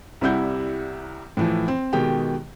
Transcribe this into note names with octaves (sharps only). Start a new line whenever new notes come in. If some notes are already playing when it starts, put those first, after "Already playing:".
C2 C3 G3 E4 F#5 G6
A2 E3 F3
C4
B2 D#3 G#3 G4 G5